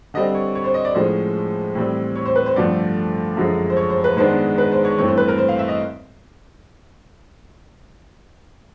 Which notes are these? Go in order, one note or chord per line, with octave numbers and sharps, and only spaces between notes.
D3 G3 C4 D#5
C#5
C#5
C5
D#5
D5
A2 F3 G#3 C#4 C5
A2 E3 G3 C4
C#5
C5
B4
C5
G2 D3 F3 A3 D5
F#2 D3 F3 G#3 C#4
C5
C#5
C5
B4
G#2 D#3 G#3 B3 D4 C5
B4
C5
C#5
G2 E3 A3 C4 C#5
C5
B4
A#4
C5
F5
E5
D#5